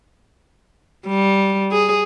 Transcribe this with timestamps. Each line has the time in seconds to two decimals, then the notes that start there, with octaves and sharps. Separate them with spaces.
1.07 G3
1.72 G#4